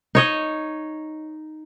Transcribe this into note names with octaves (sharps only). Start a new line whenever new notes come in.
D#4 C#5 D#5